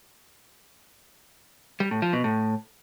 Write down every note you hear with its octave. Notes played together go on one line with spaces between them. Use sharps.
G3
A2
F3
B2
A2